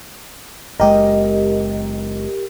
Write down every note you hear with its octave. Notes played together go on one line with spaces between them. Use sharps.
F#1 G#3 G4 A#4 D#5